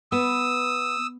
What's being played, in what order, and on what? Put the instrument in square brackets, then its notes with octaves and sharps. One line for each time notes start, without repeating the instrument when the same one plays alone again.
[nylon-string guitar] B3 [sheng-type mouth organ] D#6 E6